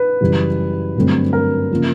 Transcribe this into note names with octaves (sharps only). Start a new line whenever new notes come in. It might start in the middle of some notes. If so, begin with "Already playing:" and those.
Already playing: B4
F#2 C#3 E3 G3
G2 D3 F#3 A3 C4
A#4
C#3 F3 A#3